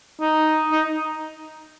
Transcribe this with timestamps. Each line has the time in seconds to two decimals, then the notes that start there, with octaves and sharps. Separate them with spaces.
0.21 D#4
0.72 D#4